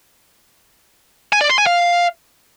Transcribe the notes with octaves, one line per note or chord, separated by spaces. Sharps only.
G#5
D5
C6
G#5
F5